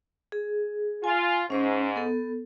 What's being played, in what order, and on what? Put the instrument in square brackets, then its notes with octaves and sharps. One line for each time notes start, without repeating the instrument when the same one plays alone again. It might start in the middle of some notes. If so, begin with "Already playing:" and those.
[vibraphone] G#4
[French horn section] F4 [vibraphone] G#5
[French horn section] G#2 [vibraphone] C#4 C5
[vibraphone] B3 A4